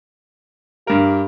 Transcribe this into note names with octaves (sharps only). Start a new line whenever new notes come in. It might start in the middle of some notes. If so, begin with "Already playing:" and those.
G2 G4 A#4